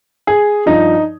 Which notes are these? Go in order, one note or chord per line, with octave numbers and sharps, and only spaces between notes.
G#4
G2 F3 D#4